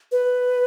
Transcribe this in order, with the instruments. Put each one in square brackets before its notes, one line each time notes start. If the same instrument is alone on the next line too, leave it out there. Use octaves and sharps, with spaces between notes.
[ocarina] B4